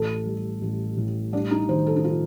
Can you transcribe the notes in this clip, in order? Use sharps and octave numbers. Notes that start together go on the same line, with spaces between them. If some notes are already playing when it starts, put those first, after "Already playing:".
Already playing: A1 A4
G3
A1
A2
G3 D4
D#4
D#3 C5
A4
D#4
F4